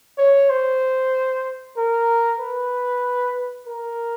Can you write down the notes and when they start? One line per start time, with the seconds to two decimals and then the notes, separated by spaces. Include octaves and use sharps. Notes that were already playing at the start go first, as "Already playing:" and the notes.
0.18 C#5
0.50 C5
1.76 A#4
2.40 B4
3.67 A#4